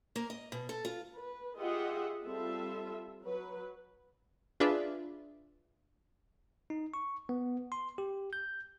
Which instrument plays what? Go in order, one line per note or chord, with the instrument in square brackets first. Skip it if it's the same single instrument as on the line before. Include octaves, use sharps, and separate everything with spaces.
[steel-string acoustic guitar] A#3
D#5
B2
A4
F4
[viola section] B4
F4 G4 G#4 D#5 E5 F#5
G3 C4 F4 A4 E5
F#3 B4
[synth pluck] D4 F4 G#4 B4 D5 E5
[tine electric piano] D#4
C#6
B3
C6
G4
G6